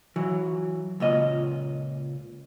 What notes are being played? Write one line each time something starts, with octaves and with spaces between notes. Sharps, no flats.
E3 F#3
C#2 A#2 D#5